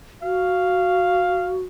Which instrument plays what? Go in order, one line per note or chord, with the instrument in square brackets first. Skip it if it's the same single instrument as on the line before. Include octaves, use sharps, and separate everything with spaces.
[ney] F#4 [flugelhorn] F5